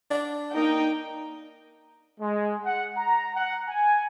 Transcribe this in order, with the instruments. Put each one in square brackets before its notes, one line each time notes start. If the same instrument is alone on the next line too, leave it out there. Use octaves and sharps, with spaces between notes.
[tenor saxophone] D4
[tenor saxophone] A#3 [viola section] D#4 G5
[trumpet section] G#3
F#5
A#5
F#5
G#5